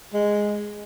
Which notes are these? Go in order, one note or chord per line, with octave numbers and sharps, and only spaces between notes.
G#3